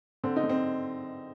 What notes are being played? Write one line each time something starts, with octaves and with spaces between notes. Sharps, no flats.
D3 C4
D#4
D3
C4